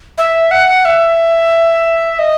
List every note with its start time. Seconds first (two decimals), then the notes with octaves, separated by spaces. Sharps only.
0.18 E5
0.51 F#5
0.85 E5
2.19 D#5